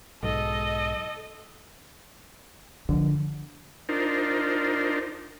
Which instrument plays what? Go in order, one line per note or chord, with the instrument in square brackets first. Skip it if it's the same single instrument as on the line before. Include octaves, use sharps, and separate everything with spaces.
[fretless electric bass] B1 G#2 [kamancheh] A4 D#5
[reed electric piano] D3 [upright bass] F3
[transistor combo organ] D4 D#4 F4 A#4 C5